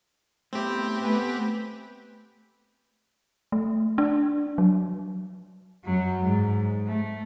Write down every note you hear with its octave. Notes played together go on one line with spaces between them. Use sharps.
A2 A3 B3 C4 G4
A3 B3 B4 G5 G#5
A3
D4
F#3
F#2 F#3
G#2
A3